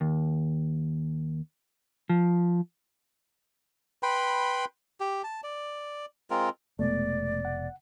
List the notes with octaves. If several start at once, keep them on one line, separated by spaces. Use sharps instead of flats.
D#2
F3
B4 G5 B5 C6
G4
A5
D5
G#3 C4 F4 A#4
F1 B2 G#3 A3 B3 D5
F#5